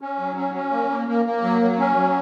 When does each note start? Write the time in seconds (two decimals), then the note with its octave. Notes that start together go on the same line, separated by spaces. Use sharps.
0.01 C#4
0.18 F#3
0.36 C#4
0.54 C#4
0.72 A#3
0.90 A#3
1.08 A#3
1.25 A#3
1.43 F#3
1.61 F#3
1.79 C#4
1.96 F#3